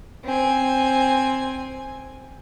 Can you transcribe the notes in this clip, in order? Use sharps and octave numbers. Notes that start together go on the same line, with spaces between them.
C4 G#5